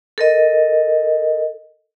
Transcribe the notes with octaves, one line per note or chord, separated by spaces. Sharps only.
A4 A#4 D#5